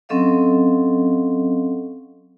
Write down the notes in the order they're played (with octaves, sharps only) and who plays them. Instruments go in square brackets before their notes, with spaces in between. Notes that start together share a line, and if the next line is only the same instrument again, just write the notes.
[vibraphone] F#3 C4 C#4 A4 D#5 F5